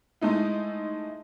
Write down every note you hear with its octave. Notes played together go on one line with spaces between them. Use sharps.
G#3 A3 D#4 E4